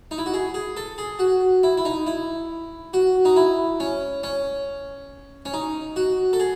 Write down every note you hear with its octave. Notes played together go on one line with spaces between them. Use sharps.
D#4
E4
F#4
G#4
G#4
A4
G#4
F#4
E4
E4
D#4
E4
F#4
D#4
E4
C#4
C#4
C#4
D#4
F#4
A4
G#4